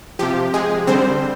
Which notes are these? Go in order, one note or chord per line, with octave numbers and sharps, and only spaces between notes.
C3 F3 G4
G#3 G#4
D3 G3 C4 C5